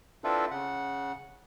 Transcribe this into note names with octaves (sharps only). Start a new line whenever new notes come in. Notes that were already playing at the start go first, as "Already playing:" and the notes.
C4 D4 E4 F4 A4 B4
C#3 F#5